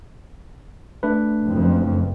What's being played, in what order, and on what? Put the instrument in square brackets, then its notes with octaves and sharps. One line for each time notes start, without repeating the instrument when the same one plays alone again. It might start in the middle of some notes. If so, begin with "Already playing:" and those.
[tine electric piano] A3 D4 B4
[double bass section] F#1 F2